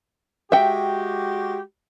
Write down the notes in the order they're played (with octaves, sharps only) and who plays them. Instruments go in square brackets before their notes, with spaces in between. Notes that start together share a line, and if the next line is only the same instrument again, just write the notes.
[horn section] G#3 F#4 G4 [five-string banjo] E5 G5